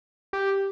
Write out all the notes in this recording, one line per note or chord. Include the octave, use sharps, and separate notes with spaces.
G4